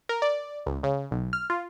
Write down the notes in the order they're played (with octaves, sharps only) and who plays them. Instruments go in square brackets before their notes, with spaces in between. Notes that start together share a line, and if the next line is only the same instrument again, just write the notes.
[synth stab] A#4
D5
C#2
C#3
B1
F6
F4